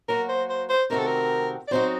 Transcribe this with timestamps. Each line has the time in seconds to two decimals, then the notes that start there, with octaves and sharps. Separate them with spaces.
0.08 F#3 A#3 F#4 A#4
0.29 C5
0.49 C5
0.69 C5
0.90 C3 D#3 A3 C4 F#4 A#4
0.99 A4
1.07 A#4
1.68 D5
1.71 F#3 C4 D#4 F#4 C5